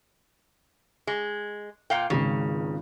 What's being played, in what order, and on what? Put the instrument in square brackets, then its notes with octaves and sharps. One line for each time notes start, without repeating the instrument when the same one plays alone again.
[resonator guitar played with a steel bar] G#3
A#2 F5 G5
[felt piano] G#1 C#2 [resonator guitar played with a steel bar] C#3